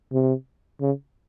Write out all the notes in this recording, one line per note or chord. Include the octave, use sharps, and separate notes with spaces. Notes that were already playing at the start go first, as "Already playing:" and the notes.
C3
C#3